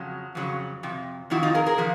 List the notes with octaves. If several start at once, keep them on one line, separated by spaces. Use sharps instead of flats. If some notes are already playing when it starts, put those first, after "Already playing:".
Already playing: F2 C#3 F#3
F2 C#3 F#3
F2 C3
F2 C3 D#3 E4 F#4
D#4 F4
G#4 A#4
G#4 A#4
D3 F3